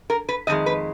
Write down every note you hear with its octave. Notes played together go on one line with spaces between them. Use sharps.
A#4
B4
F2 D#3 G#3 D#5
B4